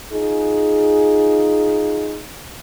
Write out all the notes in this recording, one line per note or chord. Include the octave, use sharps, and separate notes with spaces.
D#4 F4 G#4